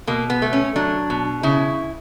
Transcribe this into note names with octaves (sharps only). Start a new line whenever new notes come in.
B2 A#3
B3
A3
C#4
F#3 D4
B2
C#3 E4